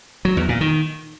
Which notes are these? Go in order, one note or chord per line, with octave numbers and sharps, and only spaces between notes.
F#3
E2
A#2
D#3